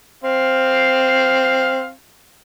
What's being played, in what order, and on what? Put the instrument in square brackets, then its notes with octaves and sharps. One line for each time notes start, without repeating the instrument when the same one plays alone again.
[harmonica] C4 F5